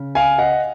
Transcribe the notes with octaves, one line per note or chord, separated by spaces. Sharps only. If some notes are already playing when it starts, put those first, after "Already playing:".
Already playing: C#3
F5 G#5
D#5 F#5